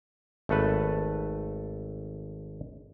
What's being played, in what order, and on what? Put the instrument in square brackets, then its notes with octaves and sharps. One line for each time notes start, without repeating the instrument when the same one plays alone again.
[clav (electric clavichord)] G#1 A3 A4 B4